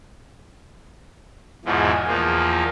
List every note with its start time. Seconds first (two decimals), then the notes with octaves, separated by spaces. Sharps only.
1.65 E2 G#2 B2 E3 F3
2.07 E2 F3 A#3